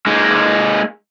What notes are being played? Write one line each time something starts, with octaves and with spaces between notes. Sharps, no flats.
G#3 A#3 D#4